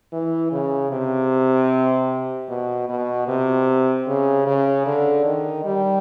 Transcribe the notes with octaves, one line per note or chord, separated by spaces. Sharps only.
E3
C#3
C3
B2
B2
C3
C#3
C#3
D3
D#3
G3